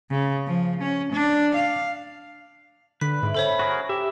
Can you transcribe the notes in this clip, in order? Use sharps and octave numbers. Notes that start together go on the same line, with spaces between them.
C#3
F3
C#4
D4
F5
D3 B4 B6
G#2 E4 D6
C#4 A4 C5 C#5 B5
F#4 G#4 A#4
G4 E5